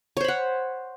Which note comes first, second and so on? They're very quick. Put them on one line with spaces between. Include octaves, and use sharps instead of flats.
C#5 C5 B5 F#5